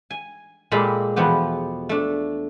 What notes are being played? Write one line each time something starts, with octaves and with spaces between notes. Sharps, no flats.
G#5
A#2 G#3 G4 A4 B5
E2 B2 F3 B3 G4
A3 D4